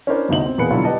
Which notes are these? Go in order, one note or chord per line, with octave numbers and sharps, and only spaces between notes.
C#4 D4 E4 A#4 C5 D5
G1 D2 C3 D#4 E5 F#7
C4
E2 B2 A#3 G#4 B4 C#7
B2 D3 F#3 G3 E4 F4
G4 B4 D5 D#5 A5